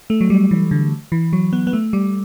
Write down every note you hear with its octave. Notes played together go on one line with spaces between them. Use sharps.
A3
F#3
G3
E3
D3
E3
F#3
B3
B3
A3
G3